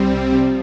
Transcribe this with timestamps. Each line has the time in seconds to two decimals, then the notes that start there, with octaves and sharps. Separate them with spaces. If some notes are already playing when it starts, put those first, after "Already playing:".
Already playing: C2 G3 C4
0.11 C3
0.32 C3 F3